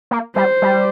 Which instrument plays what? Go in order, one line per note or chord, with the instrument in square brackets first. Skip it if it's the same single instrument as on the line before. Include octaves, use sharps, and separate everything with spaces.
[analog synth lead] A#3
[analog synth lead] G3 [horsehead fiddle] C5
[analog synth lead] G3